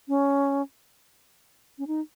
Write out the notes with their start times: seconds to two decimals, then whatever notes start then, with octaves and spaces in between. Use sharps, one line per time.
0.08 C#4
1.78 C#4
1.87 D#4